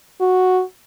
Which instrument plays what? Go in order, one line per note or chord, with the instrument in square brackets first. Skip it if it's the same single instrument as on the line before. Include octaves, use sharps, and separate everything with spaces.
[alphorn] F#4